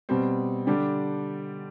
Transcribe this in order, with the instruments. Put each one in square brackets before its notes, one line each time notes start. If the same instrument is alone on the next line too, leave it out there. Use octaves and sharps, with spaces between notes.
[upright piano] B2 G3 C4
D3 G3 D4 G4